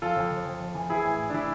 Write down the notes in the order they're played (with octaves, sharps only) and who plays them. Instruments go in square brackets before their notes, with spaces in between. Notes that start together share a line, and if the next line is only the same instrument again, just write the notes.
[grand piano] F2 F4 A4
F2
F2
F2
F2
E3
E3 E4 G#4
A2
A2
D4
E3 E4